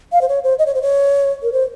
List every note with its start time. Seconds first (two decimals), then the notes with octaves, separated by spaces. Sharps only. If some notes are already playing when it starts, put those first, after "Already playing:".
0.12 F5
0.21 C5
0.29 C#5
0.44 C5
0.59 D#5
0.66 C#5
0.75 C5
0.82 C#5
1.43 A#4
1.52 C5